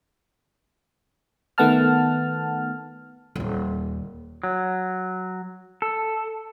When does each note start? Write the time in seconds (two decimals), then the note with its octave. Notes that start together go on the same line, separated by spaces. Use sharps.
1.58 D#3 A3 B3 F#5 A5 F6
3.36 D#1 D#2
4.43 F#3
5.82 A4